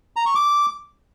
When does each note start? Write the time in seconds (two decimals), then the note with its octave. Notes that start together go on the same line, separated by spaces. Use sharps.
0.16 A#5
0.26 C#6
0.35 D6